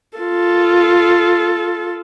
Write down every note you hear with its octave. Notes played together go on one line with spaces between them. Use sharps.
F4 A4